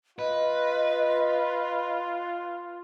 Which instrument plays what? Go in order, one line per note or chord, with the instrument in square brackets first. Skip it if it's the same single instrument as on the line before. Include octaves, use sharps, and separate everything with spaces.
[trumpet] F4 [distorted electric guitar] B4 [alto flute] D#5